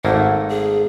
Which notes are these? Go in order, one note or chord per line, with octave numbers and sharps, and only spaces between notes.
G#1 A3 A#3 F#5
G#4